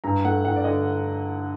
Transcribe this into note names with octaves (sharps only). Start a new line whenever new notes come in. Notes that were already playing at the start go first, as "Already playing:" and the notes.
G2 A#5
A3 F#5
G2 F#5
D5
D3 D#5